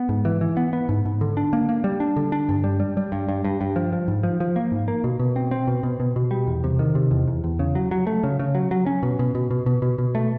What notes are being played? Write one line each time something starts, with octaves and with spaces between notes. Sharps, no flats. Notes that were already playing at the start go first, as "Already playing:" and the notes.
Already playing: B3
G#2
E3
E3
B3
B3
G#2
G#2
D3
D4
A#3
A#3
G3
D4
D3
D4
G2
G3
G3
G3
G2
G2
G2
G2
F3
F3
G#2
F3
F3
A#3
G#2
A#3
B2
B2
C4
C4
B2
B2
B2
B2
G3
E2
C3
D#3
C3
E2
E2
E2
C#3
F#3
F#3
A3
C#3
C#3
F#3
F#3
C#4
B2
B2
B2
B2
B2
B2
B2
A3